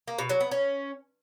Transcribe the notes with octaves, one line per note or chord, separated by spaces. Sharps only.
A#3
B2
F#3
B3
C#4